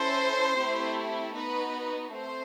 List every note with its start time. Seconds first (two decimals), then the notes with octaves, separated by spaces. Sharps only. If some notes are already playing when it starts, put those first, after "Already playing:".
Already playing: C#4 E4 A4 C5
0.56 A3 C4 E4 G4
1.34 B3 D#4 F#4 B4
2.12 A3 C4 C5